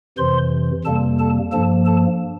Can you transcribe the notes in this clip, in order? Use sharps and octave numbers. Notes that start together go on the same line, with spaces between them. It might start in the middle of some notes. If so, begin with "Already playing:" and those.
F2 C3 E3 C5 C6
F2 C3 G3 A#3 A4 A5
A4 A5
G2 F3 A#3 A4 A5
A4 A5